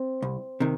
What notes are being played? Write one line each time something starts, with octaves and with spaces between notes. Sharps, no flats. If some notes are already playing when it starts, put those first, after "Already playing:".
Already playing: C4
C2
C3 D#3